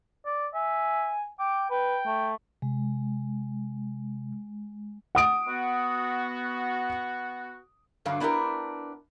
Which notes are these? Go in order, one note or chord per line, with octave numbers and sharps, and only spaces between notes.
D5
E5 G#5
G5 D6
B4 G5
A3
C3 G#3
F#5 D#6 D7
B3 F#4
G2 D3 F#3 F5
B3 D4 E4 G4 A#4